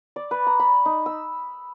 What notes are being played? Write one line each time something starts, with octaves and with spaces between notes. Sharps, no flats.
D5
B4
A#5
B5
D#4
E6